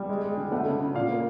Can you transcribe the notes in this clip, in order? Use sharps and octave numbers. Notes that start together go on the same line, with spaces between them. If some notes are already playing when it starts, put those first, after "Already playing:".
Already playing: G3
G#3
G#3
D3
A3 F#5
C#3
C#3
A#2 F5
A#3